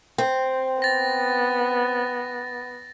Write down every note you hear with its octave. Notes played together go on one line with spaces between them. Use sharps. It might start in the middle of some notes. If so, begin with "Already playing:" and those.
C4
B3 A6 A#6